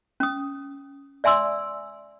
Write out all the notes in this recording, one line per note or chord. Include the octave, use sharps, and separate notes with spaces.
C#4 D#6
D5 E5 G#5 C6 E6